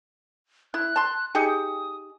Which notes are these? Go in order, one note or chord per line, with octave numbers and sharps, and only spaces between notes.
E4 F#6
A5 C6
D#4 G4 G#4 C#7
D#6